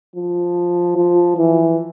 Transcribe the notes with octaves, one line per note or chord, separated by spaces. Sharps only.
F3
F3
E3